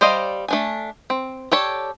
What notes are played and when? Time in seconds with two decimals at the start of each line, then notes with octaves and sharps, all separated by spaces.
0.01 G3 C5 D5 D#5 F5
0.48 A3 D4 G#5
1.10 C4
1.52 G4 A4 C#5 D5